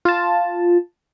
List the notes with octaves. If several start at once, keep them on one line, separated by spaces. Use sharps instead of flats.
F4 A5